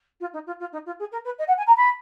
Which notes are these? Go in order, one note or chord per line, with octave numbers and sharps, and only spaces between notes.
F4
D#4
F4
F4
D#4
F4
G#4
A#4
B4
D#5
F#5
G#5
A#5
B5